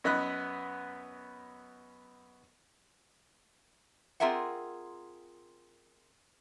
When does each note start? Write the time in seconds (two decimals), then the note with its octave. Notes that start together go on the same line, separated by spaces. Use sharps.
0.04 F#2 B3 D#5 B5 F#6
4.20 C4 F4 G#4 A#4 E5 F#5